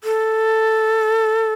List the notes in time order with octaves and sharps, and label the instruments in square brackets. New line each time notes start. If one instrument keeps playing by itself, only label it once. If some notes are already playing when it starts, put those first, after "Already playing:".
[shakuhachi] A4